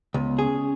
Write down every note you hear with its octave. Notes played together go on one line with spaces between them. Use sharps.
C#2 B3
C#4 G#4